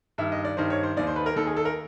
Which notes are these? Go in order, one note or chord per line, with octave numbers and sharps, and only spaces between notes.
G2 D#3 E5
D#5
D5
G2 D#3 C5
C#5
C5
D#2 D#3 D5
C5
B4
A#4
D#2 D#3 A4
G#4
A4
A#4